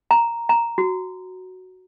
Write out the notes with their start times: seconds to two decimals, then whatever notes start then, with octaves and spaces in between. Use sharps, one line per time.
0.11 A#5
0.49 A#5
0.78 F#4